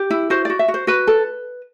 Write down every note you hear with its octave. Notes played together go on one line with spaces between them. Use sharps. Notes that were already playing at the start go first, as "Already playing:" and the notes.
Already playing: G4
E4
F#4 C5
F#4 D5
E5
F#4
C5
F#4 B4
A4